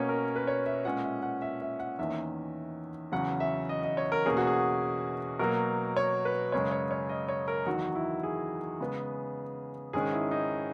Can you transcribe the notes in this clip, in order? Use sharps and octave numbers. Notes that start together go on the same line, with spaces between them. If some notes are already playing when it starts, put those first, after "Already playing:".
Already playing: B2 A#3 C#4 C#5
A#4
B4
C#5
E5
A#2 G#3 C#4 F#5
E5
F#5
E5
E5
F#5
E2 D#3 A#3 C#4 E5
E2 C#3 F#3 C#4 F#5
E5
D#5
D#5
C#5
A#4
E2 B2 A#3 C#4 G#4
F#4
G#4
B2 F#3 A#3 A#4
C#5
B4
F#2 C#3 G#3 C#5
C#5
C#5
D#5
C#5
A#4
E2 D#3 F#3 F#4
E4
G#4
C#3 G#3 B3
G#2 D#3 G#3 C#4 G#4
E4
D#4